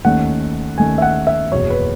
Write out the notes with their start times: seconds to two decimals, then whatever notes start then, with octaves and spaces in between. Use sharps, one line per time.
0.05 D#2 D#3 A3 C#4 F#5
0.78 D#2 D#3 A3 C#4 G#5
0.98 E5
1.02 F#5
1.27 E5
1.52 F#1 E2 B2 F#3 C#5
1.70 B4